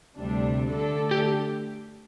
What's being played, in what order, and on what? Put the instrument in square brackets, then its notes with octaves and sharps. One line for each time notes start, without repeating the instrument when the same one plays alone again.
[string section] D2 C3 G3 D4
D3 A3 D4 A4
[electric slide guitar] G4